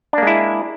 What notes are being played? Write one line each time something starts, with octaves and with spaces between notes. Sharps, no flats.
G#3 A#3 D4 E4